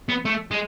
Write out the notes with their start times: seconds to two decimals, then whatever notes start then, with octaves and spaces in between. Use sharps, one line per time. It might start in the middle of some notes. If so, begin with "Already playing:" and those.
0.09 B3
0.25 A3
0.51 G#3